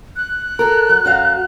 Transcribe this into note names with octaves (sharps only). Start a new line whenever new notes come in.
F#6
A4 A#4
F#3
F#2 F#4 F5